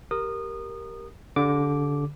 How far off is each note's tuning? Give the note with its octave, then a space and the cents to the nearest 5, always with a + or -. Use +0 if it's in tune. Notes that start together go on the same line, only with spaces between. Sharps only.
G4 +0 A#4 +0 D#6 -25
D3 -25 G4 +0 D6 -5